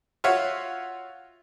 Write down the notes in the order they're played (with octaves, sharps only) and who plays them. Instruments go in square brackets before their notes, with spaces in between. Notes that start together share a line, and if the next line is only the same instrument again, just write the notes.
[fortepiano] F4 F#4 C#5 E5